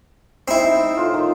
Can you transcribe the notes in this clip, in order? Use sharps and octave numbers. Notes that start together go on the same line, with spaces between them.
C4 D#4 E4
A2 F4 C6
D#3 F4